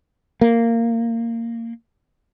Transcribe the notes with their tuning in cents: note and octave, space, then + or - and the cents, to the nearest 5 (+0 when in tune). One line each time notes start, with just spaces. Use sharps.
A#3 -15